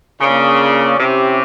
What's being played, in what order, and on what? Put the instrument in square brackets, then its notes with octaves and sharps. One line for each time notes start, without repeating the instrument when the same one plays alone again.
[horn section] C#3 [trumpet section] A#3 D4 F4 A#4 D5
[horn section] C3 [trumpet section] C#4 E4 G4